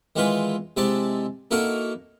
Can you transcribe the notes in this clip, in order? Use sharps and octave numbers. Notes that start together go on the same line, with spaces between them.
D#3 E3 G#3 E4 F4 B4
C3 G#3 E4 D5 A5
A#3 D#4 E4 F#4 A4 A#4